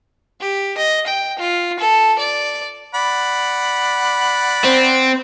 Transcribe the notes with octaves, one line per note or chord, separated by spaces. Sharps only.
G4
D#5
G5
F4
A4
D5
D5 F#5 B5
C4